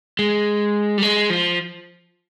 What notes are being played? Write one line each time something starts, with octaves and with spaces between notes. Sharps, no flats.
G#3
G3
G#3
F3